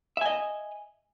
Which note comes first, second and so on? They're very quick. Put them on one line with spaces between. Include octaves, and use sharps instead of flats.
E5 G#5 D#5